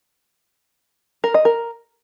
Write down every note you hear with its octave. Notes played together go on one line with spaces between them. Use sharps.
A#4
D#5
A#4